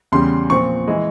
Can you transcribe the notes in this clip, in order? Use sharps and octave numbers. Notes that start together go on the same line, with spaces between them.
E2 C#3 G3 C6
A#2 F3 C4 C#6
E3 G#3